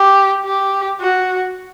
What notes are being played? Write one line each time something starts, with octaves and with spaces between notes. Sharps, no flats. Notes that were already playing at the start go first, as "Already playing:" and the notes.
Already playing: G4
G4
F#4